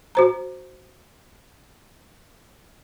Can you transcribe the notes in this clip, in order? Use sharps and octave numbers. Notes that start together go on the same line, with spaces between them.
F#4 C5 A#5